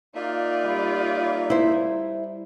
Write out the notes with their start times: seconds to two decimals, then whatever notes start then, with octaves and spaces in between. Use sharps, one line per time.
0.15 A#3 D#4 F4 D5 E5
0.64 G3
1.50 E4 C5